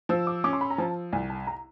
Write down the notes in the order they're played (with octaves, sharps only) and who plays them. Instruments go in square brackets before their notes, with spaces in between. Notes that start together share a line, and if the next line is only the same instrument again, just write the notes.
[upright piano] F3 [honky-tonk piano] E6
[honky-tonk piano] D6
[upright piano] C#4 [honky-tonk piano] D6
[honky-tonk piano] C6
B5
A#5
[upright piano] F3 [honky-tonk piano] A5
[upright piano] C2 [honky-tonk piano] G#5
[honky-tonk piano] A5
A#5